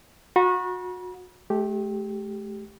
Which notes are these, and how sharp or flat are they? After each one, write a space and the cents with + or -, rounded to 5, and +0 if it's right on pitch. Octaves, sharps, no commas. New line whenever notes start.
F#4 -30 B5 -45
A3 -40 G4 +0